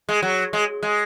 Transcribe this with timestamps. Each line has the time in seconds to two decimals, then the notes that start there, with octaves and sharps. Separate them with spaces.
0.09 G#3
0.22 F#3
0.53 G#3
0.83 G#3